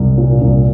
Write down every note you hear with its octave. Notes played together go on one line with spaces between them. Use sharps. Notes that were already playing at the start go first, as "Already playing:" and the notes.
Already playing: C2
A#2
C2